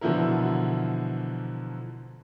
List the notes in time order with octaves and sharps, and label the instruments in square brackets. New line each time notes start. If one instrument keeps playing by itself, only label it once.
[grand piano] B2 D3 E3 F3 E4 A#4